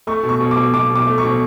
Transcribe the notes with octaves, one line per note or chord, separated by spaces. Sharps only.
A3 C#6
B2
C#6
B2
D6
B2
B2 D6
B2
D6
A3
C#6
B2